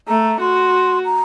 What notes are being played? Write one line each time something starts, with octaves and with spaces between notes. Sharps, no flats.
A3 A#5
F#4 C6
A#5